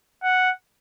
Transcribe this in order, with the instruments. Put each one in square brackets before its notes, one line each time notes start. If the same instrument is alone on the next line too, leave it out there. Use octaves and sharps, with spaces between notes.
[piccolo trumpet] F#5